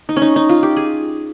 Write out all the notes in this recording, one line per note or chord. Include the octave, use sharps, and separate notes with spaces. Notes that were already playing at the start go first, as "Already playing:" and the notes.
D#4
C#4
D#4
D#4
F4
G4
G#4